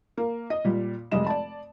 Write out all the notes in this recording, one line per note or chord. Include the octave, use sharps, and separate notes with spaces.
A#3
D#5
A#2 G3
F1 G3 G#3 D#5 E7
D5 A5